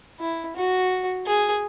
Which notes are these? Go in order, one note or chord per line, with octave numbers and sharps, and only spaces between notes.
E4
F#4
G#4